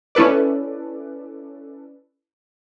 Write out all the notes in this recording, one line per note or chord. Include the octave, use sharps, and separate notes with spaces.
C#4 E4 A4 B4 D5